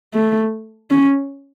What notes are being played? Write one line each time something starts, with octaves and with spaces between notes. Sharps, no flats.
A3
C#4